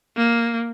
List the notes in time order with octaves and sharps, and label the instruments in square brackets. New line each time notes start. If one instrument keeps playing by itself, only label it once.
[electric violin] A#3